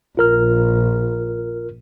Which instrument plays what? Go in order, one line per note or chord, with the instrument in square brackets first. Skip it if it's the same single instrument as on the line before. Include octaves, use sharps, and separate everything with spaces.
[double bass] A#1 [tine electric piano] F4 A#4 F6